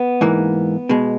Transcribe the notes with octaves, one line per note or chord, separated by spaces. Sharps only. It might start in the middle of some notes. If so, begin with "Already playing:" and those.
Already playing: B3
G#2 E3 A#3
B2 G#3